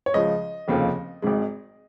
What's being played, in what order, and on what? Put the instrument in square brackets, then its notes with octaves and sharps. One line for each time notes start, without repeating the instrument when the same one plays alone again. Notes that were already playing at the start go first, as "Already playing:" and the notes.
[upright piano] C#5
C#2 C#3 F3 G#3 D#5
F1 D#2 C#3 F3 A#3
G#1 G#2 G#3